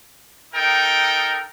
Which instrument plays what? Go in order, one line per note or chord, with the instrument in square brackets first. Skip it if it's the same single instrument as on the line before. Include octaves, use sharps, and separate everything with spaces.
[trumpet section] D#4 A4 A#4 G5